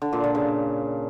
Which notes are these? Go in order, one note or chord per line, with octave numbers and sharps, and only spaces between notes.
D3
A#2
A#2
C#3